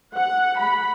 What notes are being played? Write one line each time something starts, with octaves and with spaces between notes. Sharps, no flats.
F#5
B5